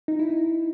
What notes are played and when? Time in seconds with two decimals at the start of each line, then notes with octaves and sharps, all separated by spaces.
0.08 D#4
0.19 E4
0.30 D#4